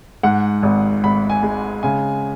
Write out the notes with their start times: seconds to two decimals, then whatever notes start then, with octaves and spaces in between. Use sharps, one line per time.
0.23 G#2 F#5
0.63 G#1
1.03 G#1 B5
1.30 G#5
1.43 G#3
1.83 C#3 G#5